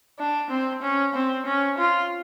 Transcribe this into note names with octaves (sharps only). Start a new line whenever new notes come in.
D4
C4
C#4
C4
C#4
F4